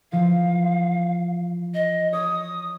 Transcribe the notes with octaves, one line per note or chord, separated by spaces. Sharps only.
E3 F3 F5
D#5
C#5 D#6